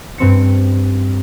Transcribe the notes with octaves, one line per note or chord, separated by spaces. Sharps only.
G2 C4 C#7